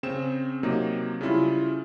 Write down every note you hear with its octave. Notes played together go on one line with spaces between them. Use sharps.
C#3 C4 E7
C3 F#3 A#3 D#4
C#3 G3 E4 F4